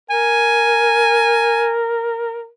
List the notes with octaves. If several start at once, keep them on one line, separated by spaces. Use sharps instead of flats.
A#4 G#5